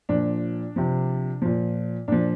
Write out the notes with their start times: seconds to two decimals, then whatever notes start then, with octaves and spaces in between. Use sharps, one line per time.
0.09 A#2 F3 D4
0.76 C3 F3
1.42 A#2 F3
2.08 A#2 F3 D4